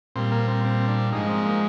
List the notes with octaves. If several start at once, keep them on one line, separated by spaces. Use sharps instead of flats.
A#2 G3 C4
A#3
C4
C4
D4
G#2 F3 G#3 D#4
C4
A#3